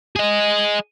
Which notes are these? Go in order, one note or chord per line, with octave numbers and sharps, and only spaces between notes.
G#4 D#5